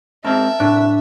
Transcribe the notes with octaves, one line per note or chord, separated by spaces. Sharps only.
G#2 C4 A#4 E5 A5
C2 A2 D4 F#6